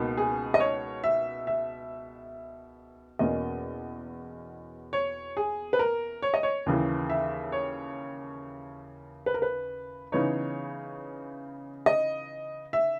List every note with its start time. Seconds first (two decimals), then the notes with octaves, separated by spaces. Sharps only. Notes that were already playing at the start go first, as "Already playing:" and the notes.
Already playing: C#2 B2 A#3 D#4
0.17 G#4
0.54 D#5
0.60 C#5
1.04 E5
1.47 E5
3.19 E2 B2 A#3 C#4 D#5
4.93 C#5
5.37 G#4
5.73 B4
5.79 A#4
6.22 C#5
6.34 D#5
6.43 C#5
6.66 D#2 C#3 E3
7.10 E5
7.52 C#5
9.26 B4
9.34 A#4
9.42 B4
10.12 C#3 E3 B3 D#4 C#5
11.86 D#5
12.73 E5